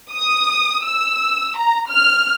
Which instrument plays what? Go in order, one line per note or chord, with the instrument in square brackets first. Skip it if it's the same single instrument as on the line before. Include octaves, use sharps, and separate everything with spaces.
[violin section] D#6
E6
A#5
F6